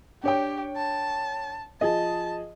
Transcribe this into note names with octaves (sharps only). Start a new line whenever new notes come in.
D4 G4 C#5 G5
A5
F3 G#4 D#5 A5